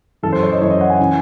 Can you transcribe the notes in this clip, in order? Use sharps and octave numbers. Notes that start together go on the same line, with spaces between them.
F#2 E3 A4
C5
C#5
D#5
F#2 E3 C#5
D#5
F#5
G#5
C#3 E3